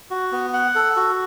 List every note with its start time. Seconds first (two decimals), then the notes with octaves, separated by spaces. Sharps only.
0.11 F#4
0.32 B3
0.53 F#5
0.75 A4
0.96 F#4